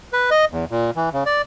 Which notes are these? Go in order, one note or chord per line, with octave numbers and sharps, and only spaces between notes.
B4
D#5
E2
A#2
E3
C#3
D5